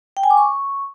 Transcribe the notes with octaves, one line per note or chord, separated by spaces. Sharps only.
G5
G#5
D6
C#6